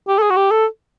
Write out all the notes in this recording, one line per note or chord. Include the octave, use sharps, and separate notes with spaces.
G4
A4
G#4
F#4
G4
A4